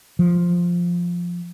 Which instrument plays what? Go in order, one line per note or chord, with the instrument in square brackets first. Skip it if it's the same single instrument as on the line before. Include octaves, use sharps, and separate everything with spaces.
[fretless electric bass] F3